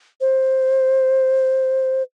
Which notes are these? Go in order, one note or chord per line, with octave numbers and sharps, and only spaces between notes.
C5